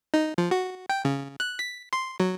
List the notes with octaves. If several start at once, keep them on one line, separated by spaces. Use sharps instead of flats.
D#4
F3
F#4
G5
C#3
F#6
B6
C6
F#3